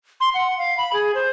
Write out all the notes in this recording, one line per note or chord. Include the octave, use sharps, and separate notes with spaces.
C6
F#5
F5
B5
G#4
C5